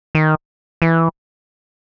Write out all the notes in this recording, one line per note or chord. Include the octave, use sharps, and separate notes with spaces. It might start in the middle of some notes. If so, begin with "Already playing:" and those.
D#3
E3